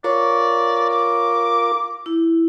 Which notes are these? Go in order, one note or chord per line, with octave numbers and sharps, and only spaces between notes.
F4 A#4 C#5 D5 C#6
D6
E4